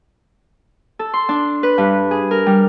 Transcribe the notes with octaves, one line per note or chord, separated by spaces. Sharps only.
A4
C6
D4
B4
G2
G#4
A#4
G3